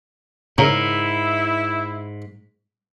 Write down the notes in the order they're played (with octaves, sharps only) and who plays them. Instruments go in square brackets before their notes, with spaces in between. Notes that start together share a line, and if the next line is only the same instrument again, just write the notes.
[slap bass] G#2 [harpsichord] C#3 [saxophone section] E4 [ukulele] A#4